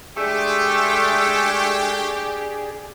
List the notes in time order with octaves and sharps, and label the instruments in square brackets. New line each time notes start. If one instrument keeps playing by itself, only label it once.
[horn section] G#3 A3 [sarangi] D4 [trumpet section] G4 [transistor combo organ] G#4